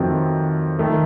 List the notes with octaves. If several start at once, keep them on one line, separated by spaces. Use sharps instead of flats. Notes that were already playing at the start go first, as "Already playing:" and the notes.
Already playing: F2 D#3 F#3 A3 C4
D#3 A3